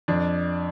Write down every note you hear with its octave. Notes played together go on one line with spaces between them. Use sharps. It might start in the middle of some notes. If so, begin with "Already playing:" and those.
F2 D4